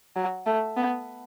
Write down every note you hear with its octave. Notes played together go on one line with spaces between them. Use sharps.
F#3
A3
B3